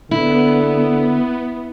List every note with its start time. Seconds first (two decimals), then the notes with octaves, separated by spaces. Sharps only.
0.11 D3 B3 E4